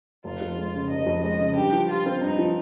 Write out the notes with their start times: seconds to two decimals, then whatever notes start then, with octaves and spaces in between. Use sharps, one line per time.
0.24 F1 F4
0.41 F2
0.57 G#3
0.75 C#3
0.90 F1 D#5
1.06 F2
1.23 G#3 D#5
1.39 C#3
1.56 G2 G4
1.73 F3
1.89 F4 G4
2.06 C4
2.21 G2 D#4
2.39 F3